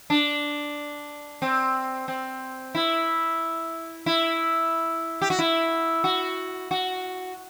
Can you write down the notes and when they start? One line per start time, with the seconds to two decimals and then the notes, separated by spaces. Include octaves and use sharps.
0.10 D4
1.42 C4
2.08 C4
2.75 E4
4.06 E4
5.22 G4
5.30 F#4
5.39 E4
6.04 F#4
6.71 F#4